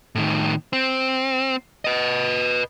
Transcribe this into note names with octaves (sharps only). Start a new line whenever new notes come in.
A2 D#3
C4
B4 D#5